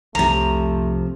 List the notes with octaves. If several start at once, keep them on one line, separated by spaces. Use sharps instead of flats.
C2 F2 C3 F3 A3 A#5